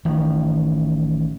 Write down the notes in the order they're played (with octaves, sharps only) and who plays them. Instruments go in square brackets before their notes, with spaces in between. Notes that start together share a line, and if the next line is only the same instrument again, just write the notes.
[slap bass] A1 D#3 F3